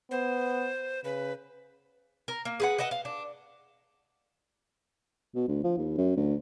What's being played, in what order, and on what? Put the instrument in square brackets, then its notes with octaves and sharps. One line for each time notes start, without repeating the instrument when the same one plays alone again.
[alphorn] B3 [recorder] C5
[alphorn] C#3 [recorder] B4
[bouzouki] A#4
A#3
G#4 B4 F#5
B4 D#5 E5 F#5
F5
D4
[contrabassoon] B2
D2
F3
D#2
F#2
D2